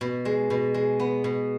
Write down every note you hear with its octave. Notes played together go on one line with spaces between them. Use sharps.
B2
G#3
B2
G#3
B3
B2